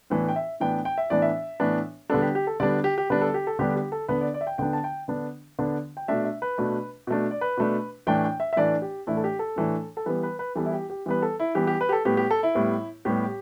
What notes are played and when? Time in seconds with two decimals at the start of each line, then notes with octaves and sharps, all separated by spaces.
0.10 A2 E3 B3 D4
0.28 G5
0.36 E5
0.60 A2 E3 B3 D4 G5
0.85 G5
0.98 E5
1.10 A2 E3 B3 D4 D5
1.22 E5
1.60 A2 E3 B3 D4
2.10 D3 G3 B3 D4 A4
2.22 G4
2.35 G4
2.47 A4
2.60 D3 G3 B3 D4 D5
2.84 G4
2.98 G4
3.10 D3 G3 B3 D4 B4
3.21 A4
3.34 G4
3.47 A4
3.59 D3 G3 B3 D4 G4
3.76 G4
3.92 A4
4.08 D3 B3 D4 B4
4.21 D5
4.34 D5
4.41 E5
4.47 G5
4.58 D3 B3 D4 G5
4.73 A5
4.84 G5
5.08 D3 B3 D4
5.59 D3 B3 D4
5.97 G5
6.08 B2 A3 D4 E5
6.25 E5
6.42 B4
6.58 B2 A3 D4
7.07 B2 A3 D4
7.31 D5
7.41 B4
7.57 B2 A3 D4
8.07 A2 E3 A3 D4 G5
8.24 G5
8.40 E5
8.53 E5
8.56 A2 E3 A3 D4 D5
8.82 G4
9.07 A2 E3 A3 D4 E4
9.17 A4
9.24 G4
9.39 A4
9.56 A2 E3 A3 D4
9.97 A4
10.06 E3 G3 B3 B4
10.23 B4
10.39 B4
10.56 E3 G3 B3 A4
10.66 E4
10.72 G4
10.90 G4
11.06 E3 G3 B3 B4
11.22 A4
11.40 E4
11.55 E3 G3 B3 G4
11.67 G4
11.81 B4
11.89 G4
11.92 A4
12.05 A2 G3 B3 G4
12.17 G4
12.31 A4
12.43 E4
12.55 A2 G3 B3
13.05 A2 G3 B3 G4